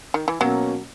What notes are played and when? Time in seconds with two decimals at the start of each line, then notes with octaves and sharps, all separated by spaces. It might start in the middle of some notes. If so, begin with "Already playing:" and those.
0.14 D#3
0.28 E3
0.40 B2 F#3 A#3 C#4